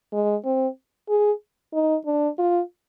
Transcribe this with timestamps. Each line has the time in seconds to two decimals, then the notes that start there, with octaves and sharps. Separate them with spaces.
0.13 G#3
0.45 C4
1.09 G#4
1.74 D#4
2.06 D4
2.39 F4